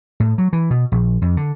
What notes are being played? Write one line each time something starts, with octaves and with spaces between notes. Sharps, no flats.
A2
F#3
E3
B2
A#1
F2
D3